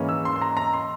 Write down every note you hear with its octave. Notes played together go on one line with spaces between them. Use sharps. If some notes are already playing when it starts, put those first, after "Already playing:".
Already playing: G#2 E3 A#3 C#4
E6
C6
C6
A#5
A#5
C6